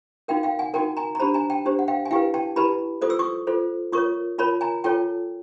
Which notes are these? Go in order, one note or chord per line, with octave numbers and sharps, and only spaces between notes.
D#4 F#4 A#4 F5 G5
F5 G5
F#5 G#5
D#4 F#4 A#4 G5 A5
G#5 A#5
A#5
D4 G4 C5 A5 B5
G#5 A#5
G5 A5
D4 G4 C5
F#5
F5 G5
G#5
E4 G4 B4 F5 G5
G5 A5
E4 G4 B4 A5 B5
F4 A4 C5 D#6
E6
C#6 D#6
F4 A4 C5
F4 A#4 C#5 C#6 D#6
F4 A#4 C#5 A5 B5
G#5 A#5
F4 A4 C#5 G5 A5